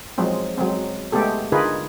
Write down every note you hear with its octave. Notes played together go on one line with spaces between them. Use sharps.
F3 F#3 G#3 C4
F#3 G#3 C4
G#3 A3 B3 G4 A4
D3 D#4 F4 G#4 A#4 B4